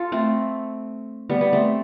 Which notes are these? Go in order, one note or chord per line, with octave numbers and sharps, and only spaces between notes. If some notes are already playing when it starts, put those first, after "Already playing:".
Already playing: F4 A4
A3 C4
G3 B3
B3
A3 C4